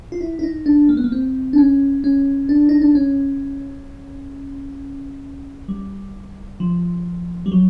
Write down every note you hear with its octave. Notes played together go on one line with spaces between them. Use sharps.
F4
E4
E4
D#4
D4
A#3
B3
A#3
C4
D4
C#4
C#4
D4
D#4
D4
C#4
G3
F3
G3
F#3